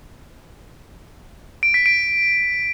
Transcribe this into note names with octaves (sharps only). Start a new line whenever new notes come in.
D7
B6
D7